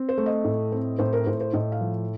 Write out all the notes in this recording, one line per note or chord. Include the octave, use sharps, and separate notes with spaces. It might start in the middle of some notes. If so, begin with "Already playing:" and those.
Already playing: C4
C5
A3
D#5
A2
C4
A2 C5
A#4
A2 C5
C5
A2 D#5
F5
F3